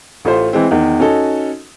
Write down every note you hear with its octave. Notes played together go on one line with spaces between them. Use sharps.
A1 A3 F4 C5
E3 G#3 C4
E2 D#3
C#4 D#4 F#4 A4